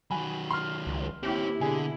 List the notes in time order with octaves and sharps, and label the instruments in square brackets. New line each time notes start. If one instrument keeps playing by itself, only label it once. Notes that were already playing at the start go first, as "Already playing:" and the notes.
[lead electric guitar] D#3 F#3 [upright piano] G#5 B5
[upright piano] C6 F6
[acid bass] C#2
[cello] D#2 E4 [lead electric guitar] C4 C#4 [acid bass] G4
[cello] B2 E4 [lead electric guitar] D3 [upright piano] G#4 G#5